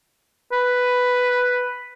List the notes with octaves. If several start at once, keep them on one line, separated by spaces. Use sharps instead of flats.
B4